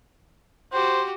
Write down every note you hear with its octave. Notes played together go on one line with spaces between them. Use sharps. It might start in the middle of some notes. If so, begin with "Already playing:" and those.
F#4 G4 C5